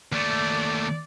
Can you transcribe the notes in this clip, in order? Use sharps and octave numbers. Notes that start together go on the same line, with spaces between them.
D#2 A3 D5